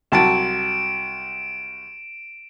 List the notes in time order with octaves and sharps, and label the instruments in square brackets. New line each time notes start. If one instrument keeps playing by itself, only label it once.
[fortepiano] C2 F#3 A5 [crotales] D7 E7